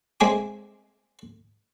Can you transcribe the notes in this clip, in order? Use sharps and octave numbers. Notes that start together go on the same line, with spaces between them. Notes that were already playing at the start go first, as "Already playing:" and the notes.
G#3 C4 E5 G#5 D6